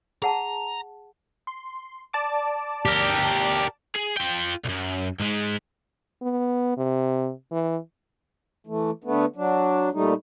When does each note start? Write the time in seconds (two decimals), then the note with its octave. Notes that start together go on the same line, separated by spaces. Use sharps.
0.22 G#4 F#5 A5 A#5
1.47 C6
2.13 D5 A5 D6
2.85 G4 A#4
3.95 G#4
4.17 F4 G5
4.65 C2 F#2
5.20 G#2 G#3
6.22 B3
6.77 C3
7.51 E3
8.67 E3 A3
9.04 D3 A3 B3
9.36 F#3 D4
9.93 A#2 G3 A3 D#4